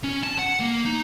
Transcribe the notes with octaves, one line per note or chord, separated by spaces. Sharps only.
C#4
A5
F#5
A#3
D#4